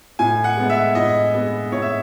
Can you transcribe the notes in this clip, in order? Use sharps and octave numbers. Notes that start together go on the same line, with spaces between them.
A2 G#5
F#5
G#3 B3
E5
A2 D#5
G#3 B3
A2 C#5
E5